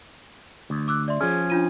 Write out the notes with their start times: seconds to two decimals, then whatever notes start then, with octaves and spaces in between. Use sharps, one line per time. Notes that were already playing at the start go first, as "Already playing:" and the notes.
0.70 D2
0.88 D6 E6 F#6
1.08 D5 E5 C6
1.21 F3 C#4 G#4
1.50 D4 F4 D#7